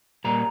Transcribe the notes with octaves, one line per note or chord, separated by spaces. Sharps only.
A#2 G3 A#3 A#5